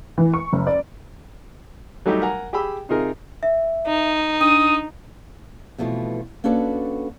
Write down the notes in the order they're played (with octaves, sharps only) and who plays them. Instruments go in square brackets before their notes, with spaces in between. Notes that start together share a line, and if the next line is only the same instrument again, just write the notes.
[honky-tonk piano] E3
C#6
F#1
D5
[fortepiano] F#3 G3 A3 D#4 G4
A#4 F#5 G#5 A#5
G4 G#4 G5 B5 E6
C3 D#4 F4 G#4 A#4
[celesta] E5
[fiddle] D#4
[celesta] D4 D#7 [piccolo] D#6
[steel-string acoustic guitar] F2 B2 E3 A3 F4
A#3 C#4 D4 F#4 A4 B4